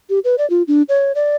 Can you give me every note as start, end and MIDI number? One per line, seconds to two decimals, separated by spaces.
0.10 0.19 67
0.24 0.36 71
0.38 0.48 74
0.50 0.63 65
0.68 0.83 62
0.89 1.12 73
1.15 1.36 74